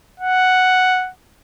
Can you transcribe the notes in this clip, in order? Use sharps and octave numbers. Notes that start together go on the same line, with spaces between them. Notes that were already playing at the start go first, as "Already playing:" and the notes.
F#5